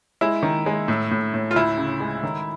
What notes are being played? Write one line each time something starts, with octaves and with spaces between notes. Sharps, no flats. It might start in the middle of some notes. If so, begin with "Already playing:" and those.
G#3 E4
D#3
G#3
A2
A2
A2
F4
D2 E4
C#3
G#3
D#3